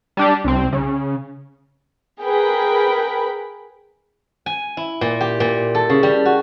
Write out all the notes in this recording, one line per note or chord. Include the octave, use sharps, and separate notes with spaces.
G3 D4 G4
C2 C4
C#3
G#4 A#4 B4 G5 B5
G#5
E4
A#2
G4
A#2
A4
C#3
G3
F#4